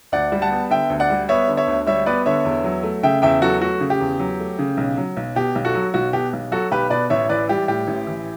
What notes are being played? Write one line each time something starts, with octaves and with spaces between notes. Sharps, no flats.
D2 D5 F#5
G3
F#5 A5
B3
D3 E5 G5
D2
D5 F#5
G3
B3 C#5 E5
D3
C#5 E5
D2
G3 C#5 E5
B3 B4 D5
D3 C#5 E5
E2
F#3
A3
C#3 E5 G5
E2 E5 G5
F#3 F#4 A4
A3 F#4
C#3
G4
E2
F#3
A3
C#3
B1
F#3
B1
B2 G4
B1
F#4 A4
F#3
B1 F#4
B2 G4
B1
F#3 F#4 A4
B1 G4 B4
B2 B4 D5
A1 C#5 E5
E3 B4 D5
G3 G4
A2 G4
A1
E3